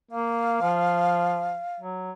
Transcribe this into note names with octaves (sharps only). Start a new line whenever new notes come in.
A#3 F5
F3
F#3